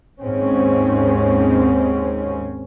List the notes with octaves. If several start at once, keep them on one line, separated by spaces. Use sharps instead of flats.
D#2 G#2 C4 C#4